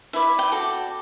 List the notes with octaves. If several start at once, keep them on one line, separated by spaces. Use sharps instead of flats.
E4 B4 D5 E5
G5
F#4 A4 D5